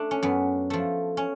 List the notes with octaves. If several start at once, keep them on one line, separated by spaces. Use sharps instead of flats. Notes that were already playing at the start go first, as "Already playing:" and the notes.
Already playing: A3 D4
C#4
F#2 B3
F3 A3
C#4